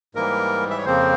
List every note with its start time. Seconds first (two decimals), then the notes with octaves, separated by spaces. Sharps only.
0.15 G#2 E3 G3 A#3 A#4
0.70 E5
0.78 C#5
0.85 F2 C#3 F3 A#3 C4 C5